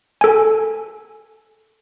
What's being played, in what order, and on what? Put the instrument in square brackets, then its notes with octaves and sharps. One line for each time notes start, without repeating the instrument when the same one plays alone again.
[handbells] A4 G#5